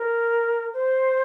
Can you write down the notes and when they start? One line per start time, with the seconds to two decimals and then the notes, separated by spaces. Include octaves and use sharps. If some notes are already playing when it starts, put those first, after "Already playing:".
Already playing: A#4
0.73 C5